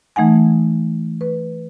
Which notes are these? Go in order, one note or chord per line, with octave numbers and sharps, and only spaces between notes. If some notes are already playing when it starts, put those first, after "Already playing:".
E3 A3 D#4 F#5 G#5
B4